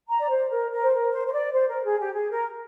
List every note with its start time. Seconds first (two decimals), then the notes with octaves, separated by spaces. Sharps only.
0.10 A#5
0.21 D5
0.29 C5
0.50 A#4
0.71 A#4
0.82 C5
0.92 A#4
1.12 C5
1.27 C5
1.33 D5
1.53 C5
1.69 A#4
1.85 G#4
1.99 G4
2.14 G#4
2.31 A#4